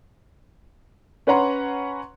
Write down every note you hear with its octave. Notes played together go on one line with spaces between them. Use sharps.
C#4 B4 C#5 F#5 A#5 C6